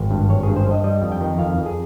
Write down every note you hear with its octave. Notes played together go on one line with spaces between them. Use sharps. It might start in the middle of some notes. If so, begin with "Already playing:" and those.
Already playing: G#1
G2
G#1 C#5
G2 G#4
C5
G2 D#5
G3 D#5
F2
G5
D#3
F2 F5
F2
G#4